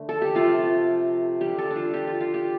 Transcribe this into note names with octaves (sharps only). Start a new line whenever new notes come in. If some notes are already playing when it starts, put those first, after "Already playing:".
Already playing: D3 A3
A4
G4
C3 F3 A3 F4
D3 G3 G4
A4
D4
F4
G4
F4
F4
G4